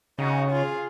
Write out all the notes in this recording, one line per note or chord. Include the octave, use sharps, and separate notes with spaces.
C#3 D#4 F#4
F4 G#4